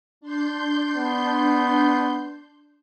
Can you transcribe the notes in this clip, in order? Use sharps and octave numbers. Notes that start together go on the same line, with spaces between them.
D4 C6 G6
B3